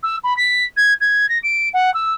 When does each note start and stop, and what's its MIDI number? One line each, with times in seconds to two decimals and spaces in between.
0.03 0.16 88
0.23 0.33 83
0.36 0.64 95
0.76 0.93 92
1.00 1.28 92
1.29 1.38 94
1.43 1.69 98
1.73 1.92 78
1.94 2.14 88